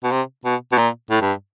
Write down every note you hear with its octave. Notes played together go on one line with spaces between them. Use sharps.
B2
C3
B2
B2
A#2
A2
G2